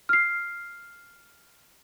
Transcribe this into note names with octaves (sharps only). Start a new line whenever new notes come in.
F6 C7